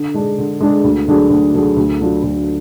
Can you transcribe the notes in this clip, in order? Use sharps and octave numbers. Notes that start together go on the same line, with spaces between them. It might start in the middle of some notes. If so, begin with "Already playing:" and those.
Already playing: D3
G#3 D4 G#4
D3
G#3 D4 G#4
D2
D3 F#3 D4 G#4
D2
D3 F#3 D4 G#4
D2
D3 F#3 D4 F4
D2